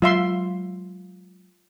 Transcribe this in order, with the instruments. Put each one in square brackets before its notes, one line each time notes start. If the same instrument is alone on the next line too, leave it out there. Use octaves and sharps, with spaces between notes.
[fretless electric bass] F#3 G#3 [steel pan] F4 E5 C6